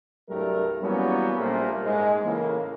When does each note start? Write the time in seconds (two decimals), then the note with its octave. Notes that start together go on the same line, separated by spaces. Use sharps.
0.29 C2 G2 F#3 G3 A3 A#4
0.82 E3 F#3 G3 A#3 B3 C#4
1.38 A#1 A#2 G3 A3 A#3 C5
1.84 G#2 G#3
2.24 A2 C#3 E3 A#3